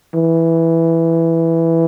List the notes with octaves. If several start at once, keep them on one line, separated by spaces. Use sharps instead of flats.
E3